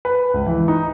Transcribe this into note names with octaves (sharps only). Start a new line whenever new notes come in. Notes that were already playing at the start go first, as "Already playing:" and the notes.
B4
C#2
E3
D#4